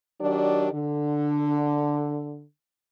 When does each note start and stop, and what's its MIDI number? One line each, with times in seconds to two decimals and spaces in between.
0.21 0.71 51
0.21 0.71 54
0.21 0.71 62
0.21 0.71 67
0.21 0.71 74
0.73 2.44 50